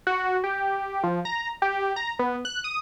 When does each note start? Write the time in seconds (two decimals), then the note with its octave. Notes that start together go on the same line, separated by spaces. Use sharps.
0.07 F#4
0.44 G4
1.03 F3
1.25 A#5
1.62 G4
1.96 A#5
2.19 B3
2.45 F#6
2.64 D#6